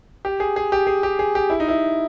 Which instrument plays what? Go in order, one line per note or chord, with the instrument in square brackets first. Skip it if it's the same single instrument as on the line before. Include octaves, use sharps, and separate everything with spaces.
[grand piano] G4
G#4
G#4
G4
G#4
G4
G#4
G4
E4
D#4
E4